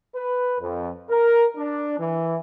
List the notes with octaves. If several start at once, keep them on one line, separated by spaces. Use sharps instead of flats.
B4
F2
A#4
D4
E3